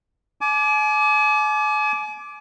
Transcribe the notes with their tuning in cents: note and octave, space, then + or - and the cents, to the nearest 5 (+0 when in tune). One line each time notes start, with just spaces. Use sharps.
G#5 +40 D6 +0